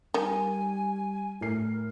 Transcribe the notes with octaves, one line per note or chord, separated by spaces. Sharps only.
D#3 G3 G#5
A2 A#4 C7